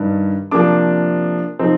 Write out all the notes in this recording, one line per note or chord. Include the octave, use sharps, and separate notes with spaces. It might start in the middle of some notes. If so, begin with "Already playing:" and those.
Already playing: G2 D#3 G3
C3 F3 A#3 D4 D6
C3 F3 C4 D#4